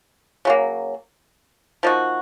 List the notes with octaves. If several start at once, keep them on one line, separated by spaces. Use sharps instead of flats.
C#3 F#3 A#3
F3 A#3 D#4 F#4